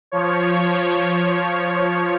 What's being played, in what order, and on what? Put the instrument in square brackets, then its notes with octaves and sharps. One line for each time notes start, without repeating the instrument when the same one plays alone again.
[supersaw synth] F3 C#5